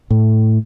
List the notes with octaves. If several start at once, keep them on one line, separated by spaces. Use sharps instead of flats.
A2